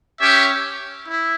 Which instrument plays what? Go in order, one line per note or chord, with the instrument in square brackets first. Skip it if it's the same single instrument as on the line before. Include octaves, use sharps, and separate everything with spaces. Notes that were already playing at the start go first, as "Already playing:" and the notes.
[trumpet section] C#4 G4 C#5 E5
E4